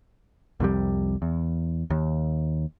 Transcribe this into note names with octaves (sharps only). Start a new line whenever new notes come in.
C2 F2 C3 G3
E2
D#2